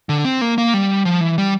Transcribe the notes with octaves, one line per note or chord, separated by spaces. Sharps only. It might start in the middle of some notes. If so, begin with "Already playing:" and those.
D3
C4
A#3
A#3
G3
F3
E3
G3